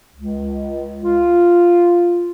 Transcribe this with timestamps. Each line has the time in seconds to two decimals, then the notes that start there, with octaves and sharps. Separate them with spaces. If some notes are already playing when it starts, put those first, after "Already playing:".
0.15 C#2
1.03 F4